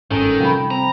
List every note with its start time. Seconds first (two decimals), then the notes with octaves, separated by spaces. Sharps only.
0.11 G1 G#2 D#3 C#4 A4
0.40 C3 F3 G3 G5 B5
0.71 C4 A#5